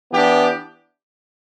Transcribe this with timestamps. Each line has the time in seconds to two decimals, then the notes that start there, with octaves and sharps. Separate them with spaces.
0.12 E3 B3 D4 G4